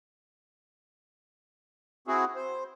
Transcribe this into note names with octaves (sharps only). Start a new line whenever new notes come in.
C4 E4 F#4 G#4
C5